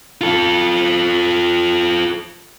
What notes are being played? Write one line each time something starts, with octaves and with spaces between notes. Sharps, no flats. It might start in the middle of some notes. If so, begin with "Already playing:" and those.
F4 A4